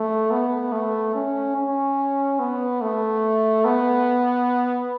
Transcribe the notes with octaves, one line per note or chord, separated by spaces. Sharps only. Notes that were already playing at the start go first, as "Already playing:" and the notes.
Already playing: A3
B3
A3
C#4
C#4
B3
A3
B3